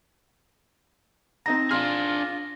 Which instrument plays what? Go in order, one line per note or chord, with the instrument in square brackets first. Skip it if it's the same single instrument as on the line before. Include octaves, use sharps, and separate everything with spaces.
[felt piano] C4 D#4 A#5 [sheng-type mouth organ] A5 [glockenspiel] A#6
[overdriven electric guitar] D4 G#4 [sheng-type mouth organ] F4 [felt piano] C6 F6